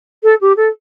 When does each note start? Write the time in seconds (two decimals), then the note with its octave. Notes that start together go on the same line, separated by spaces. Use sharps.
0.23 A4
0.41 G4
0.57 A4